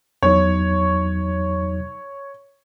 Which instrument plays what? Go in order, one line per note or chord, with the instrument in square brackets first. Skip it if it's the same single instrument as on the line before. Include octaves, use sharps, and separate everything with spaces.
[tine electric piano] E2 F#3 D#4 [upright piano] C#5